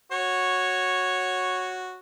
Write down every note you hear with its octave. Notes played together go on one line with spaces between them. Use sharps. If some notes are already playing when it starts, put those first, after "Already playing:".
F#4 C#5